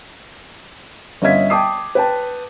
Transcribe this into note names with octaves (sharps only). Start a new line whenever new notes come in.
G1 C#4 D#5 E5 G#6 B6
G5 A5 D6 D#6 C7
B4 G5 A5